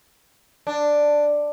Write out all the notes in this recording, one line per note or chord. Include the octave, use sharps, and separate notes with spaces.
D4